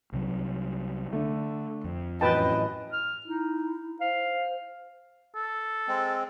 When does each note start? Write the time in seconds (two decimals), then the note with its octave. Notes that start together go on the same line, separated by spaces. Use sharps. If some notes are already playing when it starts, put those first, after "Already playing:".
0.12 C2 C3 F#3
1.13 D3 A3 D4
1.84 F2
2.21 A1 F#2 E3 B4 D#5 G5 A5
2.93 F6
3.26 D#4 E4
4.01 C5 F5
5.35 A4
5.88 G#3 C4